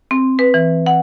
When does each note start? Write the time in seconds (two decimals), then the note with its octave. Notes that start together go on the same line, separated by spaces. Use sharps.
0.11 C4
0.39 B4
0.54 E3
0.86 F#5